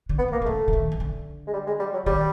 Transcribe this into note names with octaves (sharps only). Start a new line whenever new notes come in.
D3
B3
C#3 A#3
D3
C#3 A3
D3
D#3
D#3
D3
G#3
G3
G#3
G3
F#3
D#3 G3